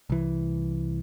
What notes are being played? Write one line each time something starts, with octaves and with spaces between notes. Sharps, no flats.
C2 E3